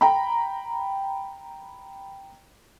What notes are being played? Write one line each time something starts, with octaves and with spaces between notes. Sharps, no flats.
G5 A#5 B5